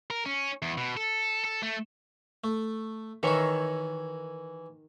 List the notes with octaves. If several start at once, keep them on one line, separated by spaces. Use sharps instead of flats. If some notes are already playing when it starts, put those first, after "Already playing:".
A#4
C#4
E2
B2
A4
A4
A3
A3
D#3 E3 F#4 C#5 E5